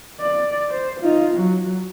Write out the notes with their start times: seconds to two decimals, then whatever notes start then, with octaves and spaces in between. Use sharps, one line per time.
0.20 D5
0.69 C5
1.00 D#4 F4
1.35 F#3